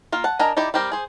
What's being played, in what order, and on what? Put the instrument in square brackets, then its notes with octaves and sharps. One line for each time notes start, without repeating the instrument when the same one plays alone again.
[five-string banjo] A#3 F4
F#5 A5
D4 A#4 D#5 G#5 A#5
D#4 E4 G4 D5
G3 C4 G4 A#4
G#4 C5